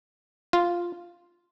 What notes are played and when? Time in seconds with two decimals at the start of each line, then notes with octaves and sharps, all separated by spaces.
0.53 F4